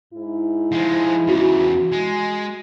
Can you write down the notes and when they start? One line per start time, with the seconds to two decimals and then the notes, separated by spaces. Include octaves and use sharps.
0.14 G#2 E4
0.72 F3 G#3
1.29 E2 C#3 F#4
1.92 G#3